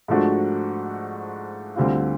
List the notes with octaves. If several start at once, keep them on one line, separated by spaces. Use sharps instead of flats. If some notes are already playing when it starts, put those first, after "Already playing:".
G#2 F3 A3 D4 F#4
D2 D3 G3 C4 F4